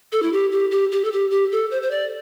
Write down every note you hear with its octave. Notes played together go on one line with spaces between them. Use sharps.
A4
E4
G4
G4
G4
G4
A4
G4
G4
A4
C5
C5
D5